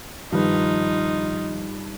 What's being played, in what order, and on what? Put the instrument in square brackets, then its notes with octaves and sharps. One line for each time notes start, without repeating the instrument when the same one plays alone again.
[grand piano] G2 G3 B4 [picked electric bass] D#3 F3 [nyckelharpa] D#4 F4